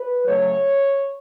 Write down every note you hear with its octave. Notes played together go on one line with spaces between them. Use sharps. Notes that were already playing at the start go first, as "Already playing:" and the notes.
Already playing: B4
C#3 F#3 A3 C#5